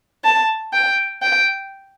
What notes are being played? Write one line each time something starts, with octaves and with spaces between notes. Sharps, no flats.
A5
G5
G5